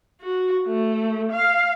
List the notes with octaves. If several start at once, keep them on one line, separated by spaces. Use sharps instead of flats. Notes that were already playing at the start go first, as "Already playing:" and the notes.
F#4
A3
F5